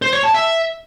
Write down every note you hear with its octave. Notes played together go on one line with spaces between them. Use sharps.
C5
C#5
A5
E5